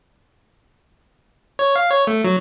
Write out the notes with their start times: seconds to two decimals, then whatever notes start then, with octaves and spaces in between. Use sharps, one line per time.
1.59 C#5
1.76 F5
1.91 C#5
2.07 A3
2.24 F#3